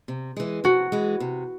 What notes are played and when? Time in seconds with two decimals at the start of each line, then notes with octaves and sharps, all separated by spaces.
0.08 C3
0.37 E3 G#3
0.64 C3 F#4
0.92 E3 G#3
1.20 C3